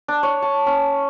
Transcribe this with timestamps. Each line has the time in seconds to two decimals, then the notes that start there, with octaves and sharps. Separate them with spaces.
0.08 D4
0.23 C#5
0.42 A5
0.66 C#4